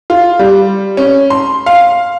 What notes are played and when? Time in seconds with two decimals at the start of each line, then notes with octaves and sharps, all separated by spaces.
0.10 F4
0.39 G3
0.97 C#4
1.30 C6
1.66 F5